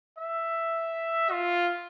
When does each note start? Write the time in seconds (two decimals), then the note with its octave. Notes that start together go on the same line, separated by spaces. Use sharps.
0.18 E5
1.31 F4